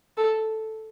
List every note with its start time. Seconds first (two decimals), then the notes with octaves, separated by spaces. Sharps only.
0.17 A4